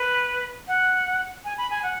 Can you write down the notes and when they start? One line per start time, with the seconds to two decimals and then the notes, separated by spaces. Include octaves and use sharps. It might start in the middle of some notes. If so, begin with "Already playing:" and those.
Already playing: B4
0.68 F#5
1.45 G#5
1.58 B5
1.70 G#5
1.83 F#5